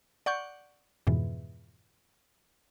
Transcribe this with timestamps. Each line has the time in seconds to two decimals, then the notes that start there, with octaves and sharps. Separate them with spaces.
0.26 D5 F#5 C#6 G6
1.07 F2 G#2 B2 E3